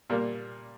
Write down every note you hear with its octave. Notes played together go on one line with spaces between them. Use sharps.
A#2 G3 A#3